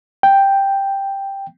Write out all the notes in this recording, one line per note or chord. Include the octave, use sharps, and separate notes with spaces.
G5